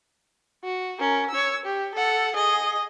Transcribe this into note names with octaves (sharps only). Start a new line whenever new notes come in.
F#4
C#4 A#4
C#5 E6
G4
A4 F#5
G#4 D#5